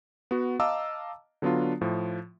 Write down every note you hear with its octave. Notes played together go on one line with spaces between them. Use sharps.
B3 F#4
D#5 F5 A5 A#5 D6 E6
D3 F#3 B3 D4 F4
A2 F3